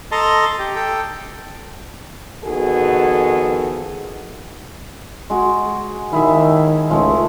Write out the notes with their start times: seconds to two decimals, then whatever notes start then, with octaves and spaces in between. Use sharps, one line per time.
0.12 A4 D#5 A5 A#5 C6
0.59 G4
0.75 A4 G5
2.45 F2 D#3 B3 F#4 G#4 A4
5.30 G#3 F#4
6.13 D#3 E4 G#4 E5
6.90 C#2 F3 G#3 A3